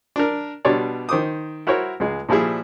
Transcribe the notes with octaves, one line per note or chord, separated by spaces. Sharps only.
D4 A#4
B2 G3 D4 C#5 D5 C6
D#3 C5 D6 D#6
E4 F#4 A#4 C5 C#5
C#2 G#3
A#2 F3 G3 E4 G#4